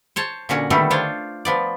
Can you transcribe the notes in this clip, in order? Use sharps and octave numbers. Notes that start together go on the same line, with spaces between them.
C5 C#5 A5
A#2 D3 C#4 F#4
D3 D#3 G3 A3 B3
D4 F4 C5 C#5
F3 B3 D5